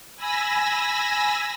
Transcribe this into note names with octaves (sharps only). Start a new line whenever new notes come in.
G#5 B5 E6 A#6